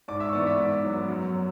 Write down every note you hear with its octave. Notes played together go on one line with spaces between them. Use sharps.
G#2 D5 D6
E5 E6
C#6
E3 B3 D4 D5 D6
E5 E6
G#2 D5 D6
F#3 B3
F#2
F#3